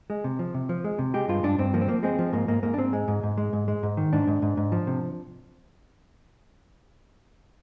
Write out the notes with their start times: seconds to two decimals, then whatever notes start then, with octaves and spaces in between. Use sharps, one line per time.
0.10 G#3
0.24 C3
0.39 F3
0.54 C3
0.69 F3
0.84 G#3
0.99 C3
1.14 G#3 G4
1.28 G2 F4
1.43 G2 D4
1.58 G2 C4
1.74 F3 A#3
1.81 C4
1.88 F3 A#3
2.03 G#3 C4
2.19 F3
2.33 G#2 A#3
2.48 G#2 A#3
2.63 G#2 A#3
2.74 D4
2.78 G#2 C4
2.93 G#3
3.08 G#2
3.23 G#2
3.38 G#3
3.53 G#2
3.68 G#3
3.83 G#2
3.97 D#3
4.13 G#2 D4
4.28 G#2
4.42 G#2
4.57 G#2
4.72 F3
4.87 C3